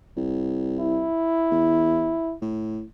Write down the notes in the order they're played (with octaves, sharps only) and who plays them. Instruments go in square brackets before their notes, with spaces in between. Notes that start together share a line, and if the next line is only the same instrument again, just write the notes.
[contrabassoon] C2
[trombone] E4
[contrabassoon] E2
A2